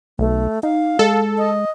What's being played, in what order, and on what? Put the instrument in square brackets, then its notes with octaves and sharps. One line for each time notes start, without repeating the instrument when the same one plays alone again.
[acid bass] B1 [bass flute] A3
[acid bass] D#4 [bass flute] F5
[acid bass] G#3 [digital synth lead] A4
[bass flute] D#5